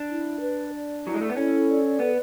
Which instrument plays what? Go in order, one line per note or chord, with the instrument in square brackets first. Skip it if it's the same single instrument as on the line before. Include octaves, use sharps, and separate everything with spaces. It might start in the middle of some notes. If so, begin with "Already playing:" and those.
Already playing: [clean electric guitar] D4
[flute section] E4
B4
D5
[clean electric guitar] F#3 [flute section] E4
[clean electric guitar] G#3
A3
B3
[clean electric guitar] C#4 [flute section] A4
[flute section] D5
[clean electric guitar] B3 [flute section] B4